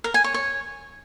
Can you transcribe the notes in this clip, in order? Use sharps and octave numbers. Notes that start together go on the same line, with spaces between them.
A#4
G#5
C#5
C#5